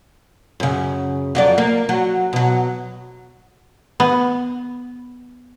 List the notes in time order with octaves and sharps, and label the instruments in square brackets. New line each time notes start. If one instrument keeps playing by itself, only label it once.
[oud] F#2 C#3
F2 F#3 D5
A#3
F#3
B2 F#3
[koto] B3